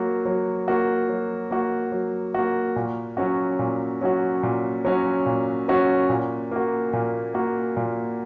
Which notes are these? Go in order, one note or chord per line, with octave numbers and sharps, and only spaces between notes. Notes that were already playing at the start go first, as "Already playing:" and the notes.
Already playing: F#3 A#3 F#4
F#3
A#3 F#4
F#3
A#3 F#4
F#3
A#3 F#4
A#2
F#3 C#4 F#4
A#2
F#3 C#4 F#4
A#2
F#3 C#4 F#4
A#2
F#3 C#4 F#4
A#2
A#3 F#4
A#2
A#3 F#4
A#2